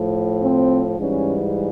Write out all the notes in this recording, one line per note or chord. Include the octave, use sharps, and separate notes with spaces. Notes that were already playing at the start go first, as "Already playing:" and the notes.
Already playing: A2 F3
C4
G#2 E3 G3 C#4